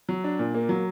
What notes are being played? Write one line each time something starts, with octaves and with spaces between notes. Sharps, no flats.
F#3
D4
A#2
A#3
F#3